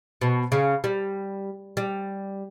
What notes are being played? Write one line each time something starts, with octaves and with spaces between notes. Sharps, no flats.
B2
C#3
G3
G3